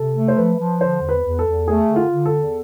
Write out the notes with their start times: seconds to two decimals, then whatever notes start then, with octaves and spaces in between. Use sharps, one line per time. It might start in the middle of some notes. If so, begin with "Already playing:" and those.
Already playing: C3 A4
0.14 A3
0.28 C5
0.37 F3 B4
0.58 F3
0.80 D3 C5
1.01 E2
1.09 B4
1.24 E2
1.39 A4
1.46 E2
1.67 A3 G#4
1.88 D3
1.96 F4
2.10 D3
2.26 A4
2.32 E2